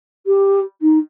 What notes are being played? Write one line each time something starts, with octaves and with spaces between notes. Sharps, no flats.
G4
D#4